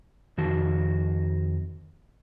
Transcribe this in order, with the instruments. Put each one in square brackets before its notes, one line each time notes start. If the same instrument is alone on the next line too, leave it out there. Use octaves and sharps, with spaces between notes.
[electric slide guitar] F2 D#3 F#4 A5